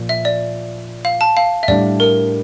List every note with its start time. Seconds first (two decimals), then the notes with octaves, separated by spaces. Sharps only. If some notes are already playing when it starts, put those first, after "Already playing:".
Already playing: A#2 F3
0.09 E5
0.25 D5
1.05 F5
1.21 A5
1.37 F5
1.63 E5
1.68 A2 G3 D4 D5
2.00 A#4